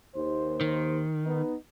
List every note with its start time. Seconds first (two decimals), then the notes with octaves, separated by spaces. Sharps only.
0.16 D#2 C5
0.61 D#3
1.25 B3 D#4